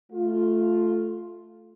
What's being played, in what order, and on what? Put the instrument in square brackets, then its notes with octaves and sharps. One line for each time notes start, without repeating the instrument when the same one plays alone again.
[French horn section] A3 F4